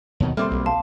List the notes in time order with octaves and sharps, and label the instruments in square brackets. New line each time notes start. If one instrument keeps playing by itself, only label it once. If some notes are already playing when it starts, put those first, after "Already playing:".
[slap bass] D#2 B2 D#3
[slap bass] G3 A#3 C4 [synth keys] A3 [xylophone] C6 D6 F6
[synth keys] B1
[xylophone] F5 A5 C6